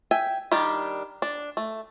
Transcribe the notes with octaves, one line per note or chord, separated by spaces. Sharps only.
E5 G5 G#5
D#3 G3 D4 G4
D4
A3